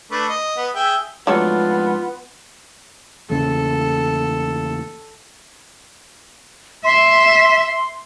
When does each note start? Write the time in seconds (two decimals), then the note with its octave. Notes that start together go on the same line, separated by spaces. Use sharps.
0.11 A3 D4 B4
0.29 D#5
0.57 B3
0.75 G#4 E5 G5
1.27 F2 G#2 F#3 A3 B3 D4 F4
3.30 E2 A#2 C#3 A4
6.85 E5 C6